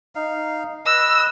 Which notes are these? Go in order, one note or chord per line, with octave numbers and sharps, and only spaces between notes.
D#4 F5
B4 D#5 E6